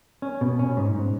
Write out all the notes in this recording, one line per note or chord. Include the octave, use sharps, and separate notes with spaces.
C#4
B2
C#4
G#2
G#2